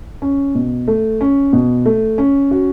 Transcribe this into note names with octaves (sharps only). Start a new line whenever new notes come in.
C#4
B2
A3
C#4
B2
A3
C#4
F#4